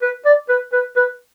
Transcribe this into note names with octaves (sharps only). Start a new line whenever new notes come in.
B4
D5
B4
B4
B4